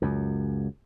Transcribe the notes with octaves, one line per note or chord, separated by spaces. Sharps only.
C#2 F#2